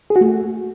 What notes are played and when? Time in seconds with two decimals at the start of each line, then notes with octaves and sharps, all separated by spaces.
0.10 G#4
0.16 F#4
0.21 A3